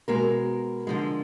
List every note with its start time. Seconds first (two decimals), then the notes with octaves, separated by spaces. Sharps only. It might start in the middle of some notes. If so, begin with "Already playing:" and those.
0.08 B2 G#3 A#4
0.87 D3 F3 G#3